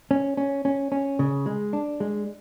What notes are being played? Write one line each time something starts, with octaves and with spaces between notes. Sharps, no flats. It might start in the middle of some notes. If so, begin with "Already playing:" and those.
C#4
C#4
C#4
C#4
C#3
G#3
D4
G#3